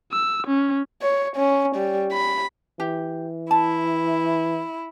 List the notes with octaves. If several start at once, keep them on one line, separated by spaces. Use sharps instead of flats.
E6
C#4
C#5
C#4
G3
B5
E3 G4
E4 A5